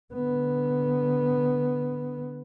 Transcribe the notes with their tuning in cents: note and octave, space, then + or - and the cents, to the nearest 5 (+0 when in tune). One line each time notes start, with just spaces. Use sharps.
D3 -5 B3 +0